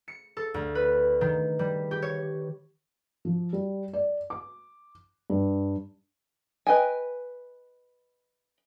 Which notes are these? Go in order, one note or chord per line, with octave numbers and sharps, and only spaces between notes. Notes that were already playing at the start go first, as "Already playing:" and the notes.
C#7
A4
D2
B4
D#3
G3
G4
C#5
F3
G3
D5
D6
G2
B4 D#5 G5 G#5